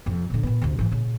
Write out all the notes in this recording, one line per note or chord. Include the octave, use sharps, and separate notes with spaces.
F2 C3
A#2 D3
A#2 B3
D2 C3
G#2 E3
A#2 C#3